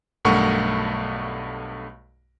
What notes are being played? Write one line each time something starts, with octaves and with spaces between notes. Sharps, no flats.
B1 G2 A3 A#4 F#5 C#6